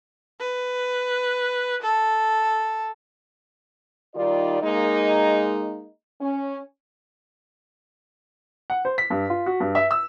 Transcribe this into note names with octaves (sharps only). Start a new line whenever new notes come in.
B4
A4
D#3 G3 D#4 F4 D5
G#3 A#3 D#4
C#4
F#5
C5
B6
G2
F4
F#4
G2
E5
E6